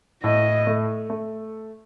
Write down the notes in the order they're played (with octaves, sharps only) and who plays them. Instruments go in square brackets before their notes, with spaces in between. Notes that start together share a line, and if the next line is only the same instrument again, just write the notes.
[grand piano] A2 [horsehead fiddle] D#5
[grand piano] A3
A3